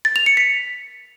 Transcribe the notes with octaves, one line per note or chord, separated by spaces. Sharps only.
A6
F7
C#7
B6